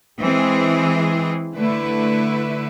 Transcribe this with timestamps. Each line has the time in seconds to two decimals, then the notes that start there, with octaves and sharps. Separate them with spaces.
0.19 E3 G#3 C4 G#4
1.55 D3 A3 E4 B4